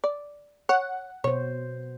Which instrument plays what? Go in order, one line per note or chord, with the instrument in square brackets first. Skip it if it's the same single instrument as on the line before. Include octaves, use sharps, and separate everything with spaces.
[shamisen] D5
[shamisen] C#5 [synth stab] F#5
[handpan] B2 C5 [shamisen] C#5